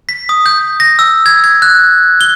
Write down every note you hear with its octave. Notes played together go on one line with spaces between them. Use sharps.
B6
D#6
G6
A#6
E6
G#6
G#6
F#6
G7